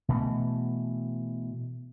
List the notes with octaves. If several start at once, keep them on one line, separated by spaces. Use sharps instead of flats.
B2 E3 A3